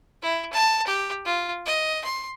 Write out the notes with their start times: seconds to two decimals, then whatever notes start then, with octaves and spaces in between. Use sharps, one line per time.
0.22 E4
0.52 A5
0.87 G4
1.25 F4
1.66 D#5
2.04 C6